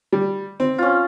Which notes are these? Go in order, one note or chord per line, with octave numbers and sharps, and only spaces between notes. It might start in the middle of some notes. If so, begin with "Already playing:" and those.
G3
C4
C#4 F4